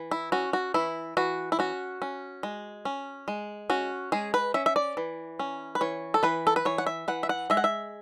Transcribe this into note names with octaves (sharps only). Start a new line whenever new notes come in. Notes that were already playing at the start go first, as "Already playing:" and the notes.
Already playing: E3
E4
C#4 F#4
F#4
E3 E4
E3 F#4
E4
C#4 F#4
C#4
G#3
C#4
G#3
C#4 F#4
G#3 G#4
B4
C#4 E5
E5
D5
E3
C#4
B4
E3 C#5
A4
E3 B4
A4
B4
E3 C#5
F#5
E5
E3 F#5
E5
F#5
G#3 E5
F#5
E5